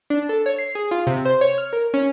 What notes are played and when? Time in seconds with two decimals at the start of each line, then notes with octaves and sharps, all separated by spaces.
0.10 D4
0.29 A4
0.46 C#5
0.58 C7
0.75 G#4
0.91 F4
1.07 C3
1.25 C5
1.41 C#5
1.58 F6
1.73 A#4
1.94 C#4